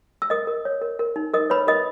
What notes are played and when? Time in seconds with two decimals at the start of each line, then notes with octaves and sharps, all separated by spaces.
0.22 E6
0.30 A#4 D#5 D#6
0.47 A#4
0.65 C#5
0.81 A#4
0.99 A#4
1.16 D#4
1.33 A#4 D#5 D#6
1.50 B4 C#5 B5
1.67 A#4 D#5 D#6